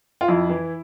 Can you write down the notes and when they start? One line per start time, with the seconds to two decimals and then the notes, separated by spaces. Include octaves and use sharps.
0.21 F4
0.28 F2 E4
0.50 E3